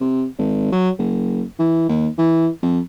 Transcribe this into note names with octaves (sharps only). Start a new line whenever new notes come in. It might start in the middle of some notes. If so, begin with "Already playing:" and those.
C3
G#1
F#3
F#1
E3
D#2
E3
F2